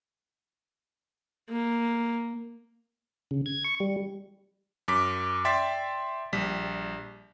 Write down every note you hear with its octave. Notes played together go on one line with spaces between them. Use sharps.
A#3
C#3
G#6
C#6
G3
F#2 D6 B6
D5 E5 G5 C6 A6 B6
A#1 G3 B6